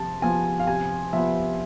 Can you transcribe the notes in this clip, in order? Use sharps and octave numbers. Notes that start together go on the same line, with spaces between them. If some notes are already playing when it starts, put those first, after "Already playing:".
Already playing: C3 F3 A5
F3 B3 G#5
F5
C3 G#5
F3 B3 E5